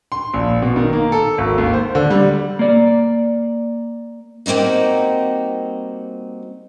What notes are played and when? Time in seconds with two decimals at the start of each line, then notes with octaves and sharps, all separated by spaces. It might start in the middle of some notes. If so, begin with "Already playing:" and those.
0.12 C6
0.34 A#1
0.62 B2
0.76 D#3
0.93 A#3
1.12 A4
1.38 G#1
1.58 D#2
1.74 C5
1.95 D3
2.10 G3
2.59 A#3 D5
4.46 G3 A#3 C4 D#4 F#4